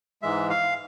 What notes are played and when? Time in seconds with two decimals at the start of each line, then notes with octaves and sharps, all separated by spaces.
0.22 G#2 E3 G#3 E5
0.50 F5